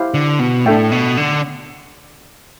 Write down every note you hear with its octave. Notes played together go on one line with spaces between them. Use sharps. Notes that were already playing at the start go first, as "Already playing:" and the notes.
Already playing: E4 G4 C5 F5
D3
B2
A2 D4 A4 E5 G5
B2
D3